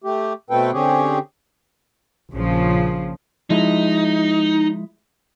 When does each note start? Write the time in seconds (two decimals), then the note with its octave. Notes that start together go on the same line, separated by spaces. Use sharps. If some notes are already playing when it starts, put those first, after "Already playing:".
0.04 A3 G4
0.50 B2 A3 C4 A4 B4 G5
0.73 D3 C4 C#4 G4 G#4
2.31 A#1 C#3 F3
3.50 F3 G#3 D#4 E4